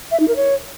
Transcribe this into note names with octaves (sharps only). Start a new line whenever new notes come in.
E5
D#4
A#4
C#5